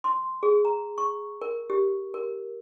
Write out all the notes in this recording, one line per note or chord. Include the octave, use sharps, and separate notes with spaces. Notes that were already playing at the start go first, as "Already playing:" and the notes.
C6
G#4
A#5
C#6
A#4
G4
A#4